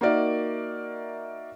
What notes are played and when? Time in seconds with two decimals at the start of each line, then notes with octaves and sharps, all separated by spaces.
0.01 A#3 D#4 F#4 A#4 D5 E5